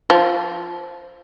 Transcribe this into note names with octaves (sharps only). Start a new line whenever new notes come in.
F3